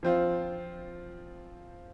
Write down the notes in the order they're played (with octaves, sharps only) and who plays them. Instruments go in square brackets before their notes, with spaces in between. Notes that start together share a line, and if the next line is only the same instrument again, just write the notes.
[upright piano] F3 C4 F4